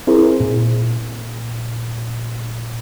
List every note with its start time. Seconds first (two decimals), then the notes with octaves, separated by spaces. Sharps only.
0.07 C4 E4 G#4 A#4 C5
0.40 A#2